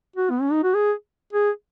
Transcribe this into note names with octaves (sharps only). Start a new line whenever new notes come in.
F#4
B3
C#4
D#4
F#4
G#4
G#4